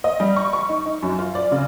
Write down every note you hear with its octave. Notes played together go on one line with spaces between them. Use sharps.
D#5
G3
C#6
C#6
D#4
D#4
F#2
F4
D5
C#3